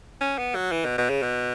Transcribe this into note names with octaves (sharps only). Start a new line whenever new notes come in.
C#4
B3
F#3
E3
B2
B2
C#3
B2